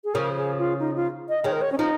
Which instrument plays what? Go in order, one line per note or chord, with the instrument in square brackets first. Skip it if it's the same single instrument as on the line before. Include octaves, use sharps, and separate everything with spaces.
[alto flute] G#4
[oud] C#3 F3 [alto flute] A#4
[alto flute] G#4
F4
D#4
F4
D#5
[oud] D#3 G#3 [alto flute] C#5
[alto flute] A#4
C#5
C#4
[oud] F3 [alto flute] D#4